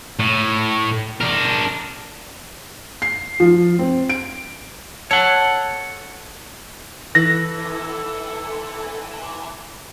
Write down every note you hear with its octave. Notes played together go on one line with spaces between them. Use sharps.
A2
D4 A#4
C7
F3
C4
D7
A4 C#5 F#5
E3 A4 A#6